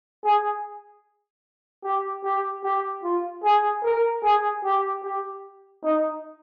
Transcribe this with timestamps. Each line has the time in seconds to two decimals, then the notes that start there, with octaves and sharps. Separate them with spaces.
0.24 G#4
1.84 G4
2.24 G4
2.64 G4
3.04 F4
3.44 G#4
3.84 A#4
4.24 G#4
4.64 G4
5.04 G4
5.84 D#4